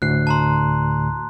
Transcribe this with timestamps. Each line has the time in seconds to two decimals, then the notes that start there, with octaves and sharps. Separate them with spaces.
0.02 D2 A2 F#6 C7
0.27 A5 A#5 C6